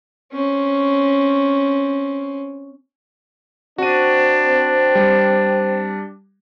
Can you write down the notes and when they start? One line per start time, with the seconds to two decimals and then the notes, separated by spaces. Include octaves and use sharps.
0.33 C4 C#4
3.78 C4 D4 F#4 D#7
4.95 G3